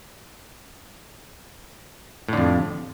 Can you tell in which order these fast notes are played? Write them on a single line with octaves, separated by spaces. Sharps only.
A2 D3 F2